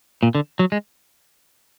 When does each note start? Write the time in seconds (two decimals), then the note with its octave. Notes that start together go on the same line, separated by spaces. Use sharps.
0.23 A#2
0.35 D3
0.59 F#3
0.72 G#3